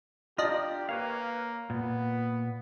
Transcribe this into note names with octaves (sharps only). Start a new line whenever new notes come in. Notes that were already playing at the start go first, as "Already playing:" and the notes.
D4 F4 G4 D#5 A#5
A#3 B4 C#5 F5
A#2 B3